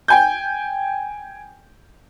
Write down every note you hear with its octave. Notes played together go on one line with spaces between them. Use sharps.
G5 G#5 G6